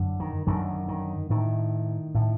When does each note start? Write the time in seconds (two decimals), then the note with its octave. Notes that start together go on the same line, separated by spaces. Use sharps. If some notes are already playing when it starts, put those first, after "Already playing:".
Already playing: F#2 D3
0.20 D#3
0.47 F#2 D3 D#3
0.88 D#3
1.30 A2 D#3
2.15 A2